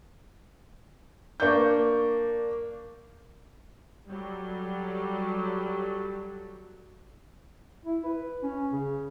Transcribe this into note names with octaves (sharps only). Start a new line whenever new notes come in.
A#3 D4 C#6 G6
F#3 G3 A4
E4
B4
C#4
C#3